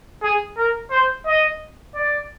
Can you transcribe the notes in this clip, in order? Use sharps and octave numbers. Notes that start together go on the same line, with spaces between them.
G#4
A#4
C5
D#5
D5